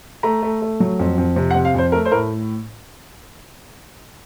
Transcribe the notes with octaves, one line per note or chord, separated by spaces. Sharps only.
A3 A#5
A3
A3
F#3
F2
F2
C3
F#5
C3
F5
F2 C5
A3 A#4
C5
A2 A#4